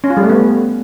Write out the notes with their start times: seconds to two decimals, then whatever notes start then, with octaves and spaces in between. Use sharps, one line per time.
0.04 C#4
0.10 F4
0.17 G3
0.23 A3
0.30 B3